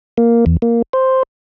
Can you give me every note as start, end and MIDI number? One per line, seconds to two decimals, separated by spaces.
0.18 0.45 58
0.46 0.57 40
0.62 0.82 58
0.93 1.23 72